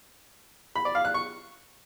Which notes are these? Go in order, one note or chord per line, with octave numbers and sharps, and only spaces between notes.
B5
D5
F5
F#6
C#6